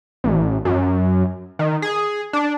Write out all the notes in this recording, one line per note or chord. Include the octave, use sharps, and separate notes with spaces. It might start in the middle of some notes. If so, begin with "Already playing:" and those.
A1
F#2
D#3
G#4
D4